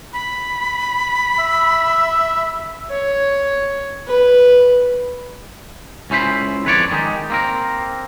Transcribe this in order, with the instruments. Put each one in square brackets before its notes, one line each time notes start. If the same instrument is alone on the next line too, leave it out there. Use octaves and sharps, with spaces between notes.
[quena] B5
[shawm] E5
[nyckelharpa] C#5
B4
[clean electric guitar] C#2 C#4 E4 C5 B5
F2 B4 C#5 D5
D#3 G#3 D#4 G4
A#3 C4 A#4